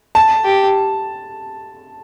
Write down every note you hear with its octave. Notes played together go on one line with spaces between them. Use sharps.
A5
G4